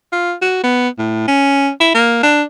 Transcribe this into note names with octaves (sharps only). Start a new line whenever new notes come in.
F4
F#4
B3
A2
C#4
E4
A#3
D4